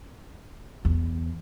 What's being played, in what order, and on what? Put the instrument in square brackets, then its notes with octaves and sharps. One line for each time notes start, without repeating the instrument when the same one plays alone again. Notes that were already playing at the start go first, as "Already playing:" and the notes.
[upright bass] E2